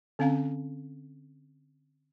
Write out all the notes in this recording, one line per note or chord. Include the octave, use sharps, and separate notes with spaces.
D3 C4 C#4 F5 A#5